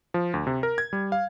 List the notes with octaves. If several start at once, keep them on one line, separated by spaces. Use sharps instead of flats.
F3
D2
C3
A#4
G#6
G3
F5